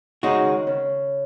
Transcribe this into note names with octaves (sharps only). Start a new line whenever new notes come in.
C#3 G#3 D#4 F#4
D#3
C#3